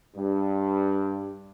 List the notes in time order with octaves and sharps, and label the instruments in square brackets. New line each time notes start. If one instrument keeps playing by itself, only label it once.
[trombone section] G2